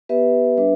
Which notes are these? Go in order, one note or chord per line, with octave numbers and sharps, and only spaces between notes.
B3 G4 B4 E5
G3 D4 B4 E5